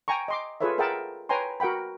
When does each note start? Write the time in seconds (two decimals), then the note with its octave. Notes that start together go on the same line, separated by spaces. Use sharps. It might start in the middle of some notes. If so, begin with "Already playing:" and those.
0.08 G5 G#5 A#5 C#6
0.28 D#5 C6 D6
0.61 F4 G#4 A4 B4 C#5 E5
0.78 G#4 A#4 E5 F#5 G5 A5
1.29 B4 C#5 G5 G#5 A#5 C6
1.60 F#4 A#4 F#5 G5 B5